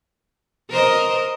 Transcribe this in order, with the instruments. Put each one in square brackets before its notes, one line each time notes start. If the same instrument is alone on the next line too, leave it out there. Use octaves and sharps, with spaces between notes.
[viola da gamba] A#4 C5 D#5